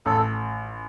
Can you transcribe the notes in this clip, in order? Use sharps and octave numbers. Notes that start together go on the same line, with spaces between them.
A1 A4